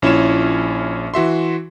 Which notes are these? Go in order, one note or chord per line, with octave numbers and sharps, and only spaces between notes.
A#1 C#4 E4 F4 C#5 E7
E3 F#4 E5 C6